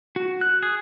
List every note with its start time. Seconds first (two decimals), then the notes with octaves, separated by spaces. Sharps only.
0.16 F#4
0.41 F#6
0.63 G#4